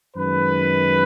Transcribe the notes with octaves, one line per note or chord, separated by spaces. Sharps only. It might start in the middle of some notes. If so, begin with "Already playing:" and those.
F#2 D#3 G#3 B4